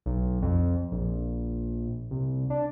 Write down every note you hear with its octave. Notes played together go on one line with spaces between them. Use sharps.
B1
F2
A#1
C2
D4